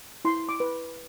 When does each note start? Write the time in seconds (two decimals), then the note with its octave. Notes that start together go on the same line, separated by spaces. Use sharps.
0.25 E4 C6
0.49 D6
0.60 B4